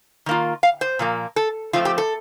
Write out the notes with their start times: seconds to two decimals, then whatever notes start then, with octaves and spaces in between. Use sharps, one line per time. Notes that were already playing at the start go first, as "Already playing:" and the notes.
0.26 D#3 A#3 F4
0.63 F5
0.81 C5
0.99 A#2 F3 A#3
1.36 A4
1.73 F3 A3 C4 F4
1.85 G4
1.98 A4